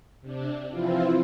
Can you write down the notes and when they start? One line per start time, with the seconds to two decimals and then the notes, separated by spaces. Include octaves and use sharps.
0.21 C3 D4
0.70 E3 F3 C4 E4 F4